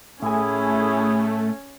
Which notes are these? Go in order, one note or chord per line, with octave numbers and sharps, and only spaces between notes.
A2 A3 C#4 E4 G#4 G#5